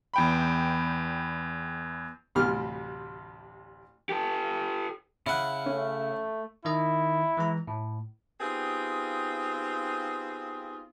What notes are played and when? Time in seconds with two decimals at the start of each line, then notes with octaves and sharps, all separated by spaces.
0.14 E2 G5 B5
2.35 A1 D2 C3 G3 F6
4.09 G4 A4
5.26 C#3 E4 F#5
5.66 A3 C#4
6.65 D#3 E4 D#5
7.37 E3 G#3 A#5
7.67 A2
8.40 B3 C4 D#4 F4 G4 G#4